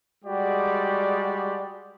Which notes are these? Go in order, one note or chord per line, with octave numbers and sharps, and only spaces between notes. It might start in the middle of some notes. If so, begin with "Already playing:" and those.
G3 G#3 F#4 G4 D5